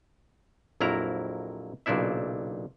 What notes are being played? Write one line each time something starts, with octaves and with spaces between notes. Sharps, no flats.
A#1 F2 F#3 E4 A#4 A#5
B1 A#2 C#3 D4 E4 E5